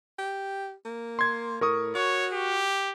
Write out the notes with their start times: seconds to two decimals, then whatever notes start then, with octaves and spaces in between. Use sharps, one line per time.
0.19 G4
0.85 A#3
1.19 C6 G#6
1.61 A2 A#4 C#6 D#6
1.95 F#4 C#5
2.33 G4